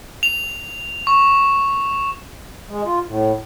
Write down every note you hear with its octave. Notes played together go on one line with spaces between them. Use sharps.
F7
C#6
G#3
F4
A2